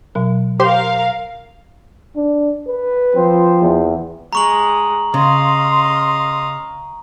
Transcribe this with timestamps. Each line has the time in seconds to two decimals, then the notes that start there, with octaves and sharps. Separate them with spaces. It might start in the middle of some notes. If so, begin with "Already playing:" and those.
0.15 B2 F#3
0.60 G4 A#4 C5 F5 C6
2.16 D4
2.68 B4
3.14 F3 C4 C5
3.62 E2
4.33 G#3 D#5 A#5 C#6 F#7
5.14 C#3 D#5 F5 C6